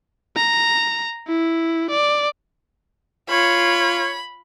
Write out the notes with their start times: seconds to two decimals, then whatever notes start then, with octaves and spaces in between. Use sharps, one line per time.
0.36 A#5
1.28 E4
1.90 D5
3.29 F4 C#5 B5